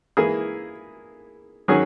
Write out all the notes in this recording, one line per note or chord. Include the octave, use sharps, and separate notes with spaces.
E3 A#3 E4 G#4
D#3 F#3 C#4 G#4